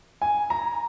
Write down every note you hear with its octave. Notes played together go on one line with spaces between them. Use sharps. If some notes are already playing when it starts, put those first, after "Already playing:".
G#5
A#5